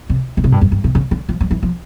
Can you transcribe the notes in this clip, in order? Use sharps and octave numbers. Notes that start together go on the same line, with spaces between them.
C3
C#3
C3
G2
F#2
G2
C3
C#3
D3
F3
F#3
E3
F3